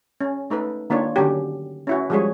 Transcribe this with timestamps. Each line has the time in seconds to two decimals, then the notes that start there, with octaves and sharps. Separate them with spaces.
0.21 C#4
0.50 A3 D#4 A4 B4
0.90 D#3 A#3 D4 F4 C#5
1.16 D3 D#3 F#3 C#4 G4
1.87 C#4 E4 F#4
2.10 F3 G3 G#3 F#4 G#4 C#5